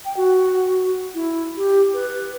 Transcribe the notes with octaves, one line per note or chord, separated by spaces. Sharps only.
G5
F#4
E4
G4
B4